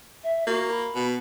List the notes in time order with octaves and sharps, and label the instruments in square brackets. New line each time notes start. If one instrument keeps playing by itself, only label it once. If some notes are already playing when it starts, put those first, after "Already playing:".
[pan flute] E5
[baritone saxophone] A#3 [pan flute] F#4
[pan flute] B5
[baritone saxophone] B2